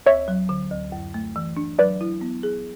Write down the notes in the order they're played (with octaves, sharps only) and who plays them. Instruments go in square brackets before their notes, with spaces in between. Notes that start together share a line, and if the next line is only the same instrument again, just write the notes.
[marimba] D2 [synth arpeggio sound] C#5 E5
[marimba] F#3
D3
D2
F#2
A3
E3
D4
[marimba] F#3 [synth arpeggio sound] B4 D5
[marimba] E4
B3
G#4